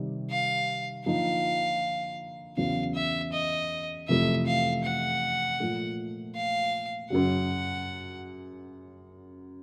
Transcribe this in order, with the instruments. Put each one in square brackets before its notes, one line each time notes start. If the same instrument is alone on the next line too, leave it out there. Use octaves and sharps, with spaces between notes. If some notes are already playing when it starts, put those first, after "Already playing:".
Already playing: [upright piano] C3 D#3 G3
[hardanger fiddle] F5
[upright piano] D3 F3 A#3 D#4 [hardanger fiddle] F5
[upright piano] E2 C#3 F#3 B3 [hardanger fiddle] F5
[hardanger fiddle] E5
D#5
[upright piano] F2 C3 E3 A3 [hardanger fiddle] E5
[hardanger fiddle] F5
F#5
[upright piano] A#2 F3 A3
[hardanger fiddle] F5
[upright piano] F#2 C#3 F#3 [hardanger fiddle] F#5